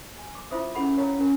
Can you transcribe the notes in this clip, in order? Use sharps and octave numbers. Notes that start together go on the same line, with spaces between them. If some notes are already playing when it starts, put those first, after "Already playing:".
G#5
D6
E4 F4 C5 E5 D#6
C#4 E4 G#4 A4 F#5 B5
A#4 C#5 F5 G5 A#5
C#4 A#4 G5